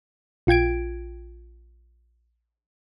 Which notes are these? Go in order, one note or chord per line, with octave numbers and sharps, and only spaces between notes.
A#1 F4 G5 G#6 D7